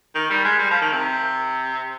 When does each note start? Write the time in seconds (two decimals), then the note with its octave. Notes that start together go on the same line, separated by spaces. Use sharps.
0.15 D#3
0.30 G3
0.44 G#3
0.59 G3
0.71 F3
0.81 D#3
0.92 C3